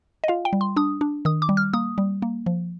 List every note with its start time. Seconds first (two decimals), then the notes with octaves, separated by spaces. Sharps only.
0.24 D#5
0.28 F4 F5
0.45 G5
0.53 G3
0.61 C6
0.76 D4 D#6
1.01 D4
1.25 D#3 D#6
1.42 D6
1.49 G3
1.57 F6
1.73 A#3 D#6
1.98 G3
2.22 A#3
2.46 F3